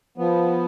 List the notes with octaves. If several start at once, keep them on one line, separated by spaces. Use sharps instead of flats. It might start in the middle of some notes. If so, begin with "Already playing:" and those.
F3 B3